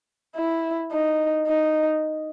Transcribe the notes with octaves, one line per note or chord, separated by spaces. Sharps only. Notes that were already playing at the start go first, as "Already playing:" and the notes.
E4
D#4
D#4